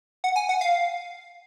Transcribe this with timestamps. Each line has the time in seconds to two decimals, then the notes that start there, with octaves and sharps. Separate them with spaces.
0.24 F#5
0.36 G#5
0.49 F#5
0.61 F5